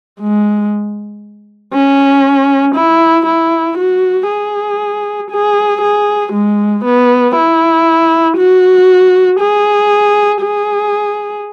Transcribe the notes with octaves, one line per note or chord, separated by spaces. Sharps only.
G#3
C#4
E4
E4
F#4
G#4
G#4
G#4
G#3
B3
E4
F#4
G#4
G#4